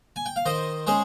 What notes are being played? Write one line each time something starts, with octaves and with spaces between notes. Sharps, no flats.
G#5
G5
F5
D#3 C5 D#5
G#3 C#4 G#4 C5